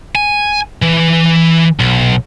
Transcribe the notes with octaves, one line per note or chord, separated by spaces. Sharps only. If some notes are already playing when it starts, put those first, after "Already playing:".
G#5
E3
B1